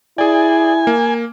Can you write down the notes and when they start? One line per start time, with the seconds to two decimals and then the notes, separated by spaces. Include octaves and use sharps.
0.18 E4 G#4 D5 G#5
0.87 A#3